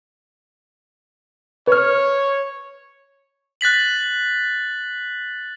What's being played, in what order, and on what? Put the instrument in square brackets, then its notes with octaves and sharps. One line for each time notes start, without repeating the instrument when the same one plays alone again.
[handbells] B4 F6 [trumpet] C#5
[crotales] F#6 A6 B6 F#7